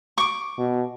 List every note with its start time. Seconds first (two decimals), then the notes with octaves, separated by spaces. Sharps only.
0.18 C#6 D6
0.59 B2